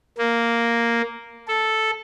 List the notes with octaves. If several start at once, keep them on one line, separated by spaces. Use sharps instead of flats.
A#3
A4